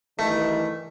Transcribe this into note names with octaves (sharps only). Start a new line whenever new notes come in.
G2 D#3 E3 A3